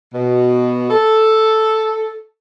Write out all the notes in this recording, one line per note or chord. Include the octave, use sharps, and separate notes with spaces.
B2
A4